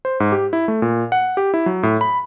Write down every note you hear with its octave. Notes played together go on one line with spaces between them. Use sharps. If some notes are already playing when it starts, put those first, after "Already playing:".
C5
G#2
G4
E4
A3
A#2
F#5
G4
E4
F#3
A2
B5